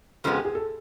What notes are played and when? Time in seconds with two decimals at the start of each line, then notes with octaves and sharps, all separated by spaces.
0.24 F2 C#3 F3 G#3 B3 A4
0.35 G4
0.45 G#4
0.55 A4